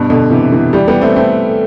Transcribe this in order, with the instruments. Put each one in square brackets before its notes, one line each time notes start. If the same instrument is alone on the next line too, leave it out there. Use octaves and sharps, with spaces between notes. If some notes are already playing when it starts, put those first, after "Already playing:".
Already playing: [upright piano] G2 B2
B2 D3
C3 E3
C3 E3
E3 G3
G3 B3
A3 C4
A3 C4